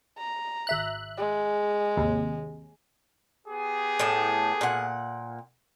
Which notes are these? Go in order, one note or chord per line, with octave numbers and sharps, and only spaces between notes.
A#5
G#1 E5 F#6
G#3
G#1 D#2 C3
B3 G4 G#4
A2 A5
A#2 F#5